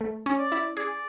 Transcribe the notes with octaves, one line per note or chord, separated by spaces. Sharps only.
A3
C#4
D5
E4
G#4 D5